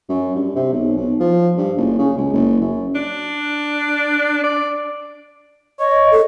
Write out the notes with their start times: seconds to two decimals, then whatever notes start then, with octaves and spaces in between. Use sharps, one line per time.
0.09 F#2
0.35 G2
0.56 C3
0.72 B1
0.97 B1
1.20 F3
1.58 G2
1.77 F#1
1.99 C#3
2.17 C#2
2.33 F#1
2.61 F#2
2.95 D4
4.44 D5
5.80 C#5 D#5
6.11 A4